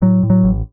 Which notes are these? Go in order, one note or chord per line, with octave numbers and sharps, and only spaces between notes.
A2 F#3
A2
F#3
A1